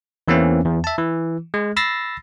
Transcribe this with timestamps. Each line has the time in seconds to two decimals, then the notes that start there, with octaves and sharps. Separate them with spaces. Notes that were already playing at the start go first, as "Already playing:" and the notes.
0.28 E2 E3 A#3 C4 C#4
0.65 E2
0.84 E5 A5
0.98 E3
1.54 G#3
1.77 B5 E6 A6 A#6 C7